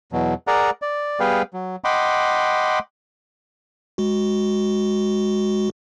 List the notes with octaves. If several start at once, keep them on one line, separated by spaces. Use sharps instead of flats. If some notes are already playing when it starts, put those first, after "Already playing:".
E2 B2 F#3
G#4 A#4 D5 F#5 A#5
D5
G3 B3 G#4 B4 F5 G5
F#3
D#5 F#5 G5 B5 C6 D6
G#3 F#4